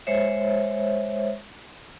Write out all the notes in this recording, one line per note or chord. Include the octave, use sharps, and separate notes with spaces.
G#3 C5 C#5 E5